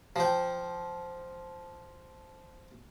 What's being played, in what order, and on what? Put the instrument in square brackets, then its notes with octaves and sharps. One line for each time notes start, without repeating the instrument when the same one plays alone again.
[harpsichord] F3 G5